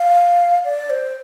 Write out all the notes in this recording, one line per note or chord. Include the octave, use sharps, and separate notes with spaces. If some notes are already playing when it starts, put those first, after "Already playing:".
Already playing: F5
D5
C5